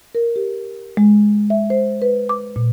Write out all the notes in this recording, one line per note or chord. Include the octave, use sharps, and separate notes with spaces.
A#4
G4
G#3
E5
C5
B4
D6
A#2